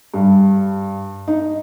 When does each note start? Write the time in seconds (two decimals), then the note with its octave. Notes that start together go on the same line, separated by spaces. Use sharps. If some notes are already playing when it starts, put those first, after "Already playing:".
0.14 G2
1.28 D#4